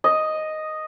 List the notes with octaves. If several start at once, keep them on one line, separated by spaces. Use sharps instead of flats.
D#5